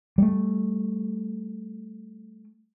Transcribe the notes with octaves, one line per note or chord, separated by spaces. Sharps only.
G3 A3